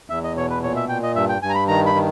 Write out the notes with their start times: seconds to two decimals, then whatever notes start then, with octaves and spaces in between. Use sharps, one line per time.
0.10 E2 E5
0.24 D#5
0.36 B2 C#5
0.50 B4
0.63 A#2 C#5
0.76 E5
0.89 A#2 G5
1.03 D#5
1.15 G2 E5
1.29 G5
1.42 G2 G#5
1.50 A#5
1.55 B5
1.68 D#3 A#5
1.86 B5
1.95 D#3